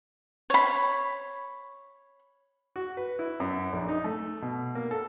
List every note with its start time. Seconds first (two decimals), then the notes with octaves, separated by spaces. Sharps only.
0.50 C#5 B5
2.76 F#4
2.97 B4
3.19 E4
3.40 F#2
3.73 A#1
3.88 D#4
4.04 A3
4.42 B2
4.75 A#3
4.91 A4